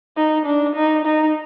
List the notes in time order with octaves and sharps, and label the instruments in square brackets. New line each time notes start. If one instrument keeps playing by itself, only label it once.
[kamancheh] D#4
D4
D#4
D#4